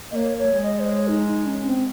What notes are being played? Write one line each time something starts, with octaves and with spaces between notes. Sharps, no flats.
A#3 C#5 D#5
C#5
G#3
D#5
C5
C#5
D#4
D#4
C#4
C4